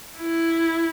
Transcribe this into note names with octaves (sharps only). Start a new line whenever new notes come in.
E4